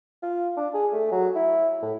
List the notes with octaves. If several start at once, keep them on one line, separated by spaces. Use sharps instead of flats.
F4
D4
G#4
A3
F#3
E4
A2